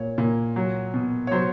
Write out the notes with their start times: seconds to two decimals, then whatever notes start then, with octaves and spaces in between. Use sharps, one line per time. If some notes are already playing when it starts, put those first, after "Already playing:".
Already playing: A#2 C#5
0.18 A#2
0.56 F#3
0.94 B2
1.27 C#5
1.31 F#3 C5